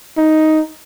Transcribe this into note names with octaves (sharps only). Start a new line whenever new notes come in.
D#4